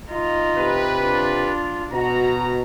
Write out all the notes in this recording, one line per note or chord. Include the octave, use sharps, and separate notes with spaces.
D#4 F4
C3 G4 B4
D4 F4
B2 F#4 A#5